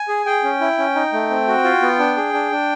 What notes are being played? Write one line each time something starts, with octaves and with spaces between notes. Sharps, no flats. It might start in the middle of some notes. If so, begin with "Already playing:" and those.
Already playing: G#5
G#4
G#4 G5
C#4
E4
C#4
D#4
A3
C4
F#4
F4
B3
D4
G#4
D4
D4